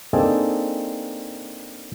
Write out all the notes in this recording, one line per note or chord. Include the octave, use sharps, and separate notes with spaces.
A#3 C4 D4 D#4 G#4 A4